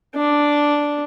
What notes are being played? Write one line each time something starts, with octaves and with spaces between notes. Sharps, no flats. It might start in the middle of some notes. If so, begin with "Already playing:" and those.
D4